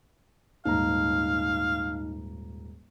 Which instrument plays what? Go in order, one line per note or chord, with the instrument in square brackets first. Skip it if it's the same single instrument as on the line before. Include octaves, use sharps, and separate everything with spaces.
[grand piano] D#1 G#2 A#5 [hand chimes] D#4 [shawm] F5